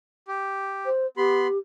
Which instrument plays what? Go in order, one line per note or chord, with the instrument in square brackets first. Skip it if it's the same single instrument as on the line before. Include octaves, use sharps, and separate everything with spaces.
[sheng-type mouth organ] G4
[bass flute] C5
[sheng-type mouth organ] B3 B5 C6 [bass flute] G4